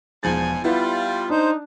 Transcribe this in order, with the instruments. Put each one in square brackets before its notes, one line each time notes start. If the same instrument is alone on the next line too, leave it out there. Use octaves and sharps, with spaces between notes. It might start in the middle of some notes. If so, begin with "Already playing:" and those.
[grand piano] E1 F3 A6 [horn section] G#2 G#5
[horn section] G3 [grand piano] B3 E4 B4 [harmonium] F4
[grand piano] D4 [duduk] D#4 [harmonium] C5